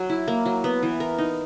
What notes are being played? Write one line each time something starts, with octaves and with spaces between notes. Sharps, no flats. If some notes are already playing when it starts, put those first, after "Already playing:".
Already playing: F#3
E4
A#3
F#3
B3
E3
A#4
D#4